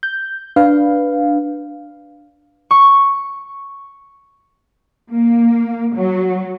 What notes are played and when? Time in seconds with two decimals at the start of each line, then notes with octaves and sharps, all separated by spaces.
0.03 G6
0.56 D4 B4 F5
2.71 C#6
5.11 A#3
5.96 F#3